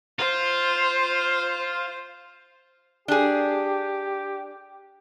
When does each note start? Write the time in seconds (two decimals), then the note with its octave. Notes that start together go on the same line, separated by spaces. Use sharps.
0.19 F4 C5
3.08 D4 G4 G#4